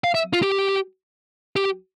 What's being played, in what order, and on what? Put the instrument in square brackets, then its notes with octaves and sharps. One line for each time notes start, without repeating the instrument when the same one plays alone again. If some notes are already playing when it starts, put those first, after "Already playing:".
[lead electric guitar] F5
E5
F4
G4
G4